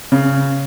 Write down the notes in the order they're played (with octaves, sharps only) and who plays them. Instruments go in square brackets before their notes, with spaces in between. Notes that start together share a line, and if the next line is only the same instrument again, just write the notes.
[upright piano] C#3